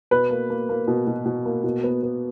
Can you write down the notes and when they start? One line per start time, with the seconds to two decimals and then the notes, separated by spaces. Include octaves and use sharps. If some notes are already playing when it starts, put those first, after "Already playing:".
0.11 B2 B4
0.30 A#3
0.50 A#3
0.69 A#3
0.88 B2
1.07 B2
1.25 B2
1.45 A#3
1.64 B2
1.83 B3
2.03 B3